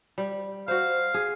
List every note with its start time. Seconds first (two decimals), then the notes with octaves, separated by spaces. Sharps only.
0.18 G3
0.68 F#4 C5 F5
1.14 G#4